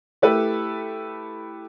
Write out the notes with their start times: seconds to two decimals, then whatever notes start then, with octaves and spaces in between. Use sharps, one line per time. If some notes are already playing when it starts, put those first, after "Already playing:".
0.22 A3 E4 G4 A4 B4